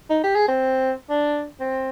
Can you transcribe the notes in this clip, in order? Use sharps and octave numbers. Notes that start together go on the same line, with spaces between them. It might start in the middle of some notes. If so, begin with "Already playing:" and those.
D#4
G4
G#4
C4
D4
C4